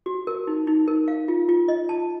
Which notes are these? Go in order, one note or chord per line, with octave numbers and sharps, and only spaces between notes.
F#4
A#4
D#4
D#4
A#4
F5
F4
F4
D#5
A5